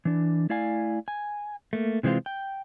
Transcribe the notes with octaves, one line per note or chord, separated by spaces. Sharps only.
E3 D4
A3 E4 D5 F5 G#5
G#5
A3 A#3
C3 E3 G#3 C4 F4
G5